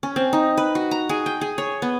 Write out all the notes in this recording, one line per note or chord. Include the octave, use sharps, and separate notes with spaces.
C#4
C4
D#4
B4
F#4
A#5
G#4
G5
G#4
C#5
B3